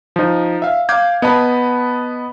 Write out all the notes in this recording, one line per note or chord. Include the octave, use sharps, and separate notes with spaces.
F3 D#4
E5 F5
F5 D6 G6 G#6
B3 D#5 A5 B5